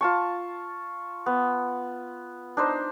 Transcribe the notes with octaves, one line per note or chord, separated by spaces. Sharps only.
F4 A5 C#6
B3
D4 D#4 C5